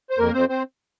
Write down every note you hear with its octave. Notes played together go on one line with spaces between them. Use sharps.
C5
F2 A#3 A#4
F2 C4 C5
C4 C5